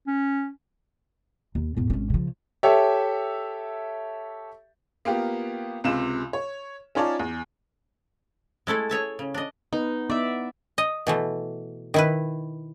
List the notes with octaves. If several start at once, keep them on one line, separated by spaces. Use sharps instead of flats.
C#4
D#2
E2 A2
G#1 C#4
C#3 F3
G4 A4 C#5 E5
A#3 B3 F4 G4
C#2 C3 F4 E7
C#5
C#4 D#4 F4 C#5 D5 A5
E2
G#3 A3 E4 A4
G#4 C#5 E5 A5
C#3
D4 D#5
B3 D#4 B4
B3 D#4 E4 D5 E5
D#5
B2 E3 A3
D#3 E4 B4